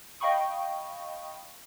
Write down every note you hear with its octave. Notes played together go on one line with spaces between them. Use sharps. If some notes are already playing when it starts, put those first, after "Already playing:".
D#5 F5 G5 B5 C#6 D#6